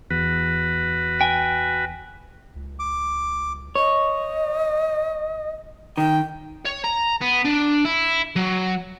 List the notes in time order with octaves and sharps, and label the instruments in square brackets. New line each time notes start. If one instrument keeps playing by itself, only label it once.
[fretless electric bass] E2 [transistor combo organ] F#4 B4
[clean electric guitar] G5 G#5
[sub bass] C#2
[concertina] D6
[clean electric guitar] C#5 [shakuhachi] D#5
[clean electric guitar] D#3 [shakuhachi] G5
[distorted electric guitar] C#5
A#5
B3
D4
E4
F#3